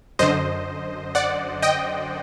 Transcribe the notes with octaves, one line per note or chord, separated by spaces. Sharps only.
F#2 D3 C5 D#5
D5 F#5
D#5 G5